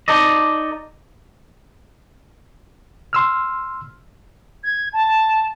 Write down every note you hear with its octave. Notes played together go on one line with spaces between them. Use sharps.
D#4 A4 D5 D#5
C6 E6 F6
G#6
A5